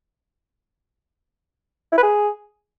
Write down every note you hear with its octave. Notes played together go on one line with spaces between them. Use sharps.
E4
B4
G#4